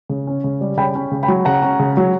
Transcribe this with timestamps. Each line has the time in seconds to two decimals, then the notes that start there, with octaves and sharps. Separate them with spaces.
0.10 C#3
0.27 C#4
0.44 C#3
0.61 G3
0.77 C#3 G5 B5
0.95 C#4
1.11 C#3
1.23 G5 B5
1.28 F#3
1.45 C#3 F#5 A#5
1.62 C#4
1.80 C#3
1.97 F#3